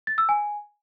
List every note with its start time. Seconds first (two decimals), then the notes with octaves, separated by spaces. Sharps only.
0.07 A6
0.18 E6
0.29 G#5